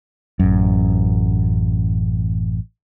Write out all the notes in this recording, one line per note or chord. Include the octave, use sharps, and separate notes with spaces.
A1 F#2